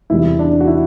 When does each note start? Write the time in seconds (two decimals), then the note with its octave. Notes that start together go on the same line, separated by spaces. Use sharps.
0.10 E2 C3 G3 E4
0.39 D4
0.61 F#4
0.67 E4